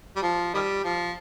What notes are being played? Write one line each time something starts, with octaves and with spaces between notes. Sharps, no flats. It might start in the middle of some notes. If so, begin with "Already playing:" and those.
G3
F3
D#3 G3
F3